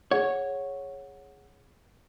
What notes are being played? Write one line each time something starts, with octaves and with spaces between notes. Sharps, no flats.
G#4 C#5 F#5